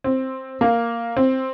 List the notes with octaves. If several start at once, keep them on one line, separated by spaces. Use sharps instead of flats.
C4
A#3
C4